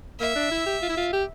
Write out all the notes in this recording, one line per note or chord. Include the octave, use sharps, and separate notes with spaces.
A#3 E5
D4
E4
G4
F4
E4
F4
G4